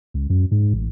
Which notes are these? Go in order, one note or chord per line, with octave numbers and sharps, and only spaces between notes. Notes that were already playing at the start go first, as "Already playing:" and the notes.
C#2
F#2
G#2
A1